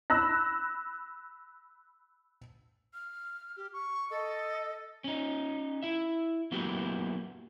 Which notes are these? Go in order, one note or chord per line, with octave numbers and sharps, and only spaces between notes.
B5 E6 F#6 A#6
F6
G4
C#6
A4 D#5
C#4 D#4
E4 E5
F#3 A#3 B3 E4 F#4 G4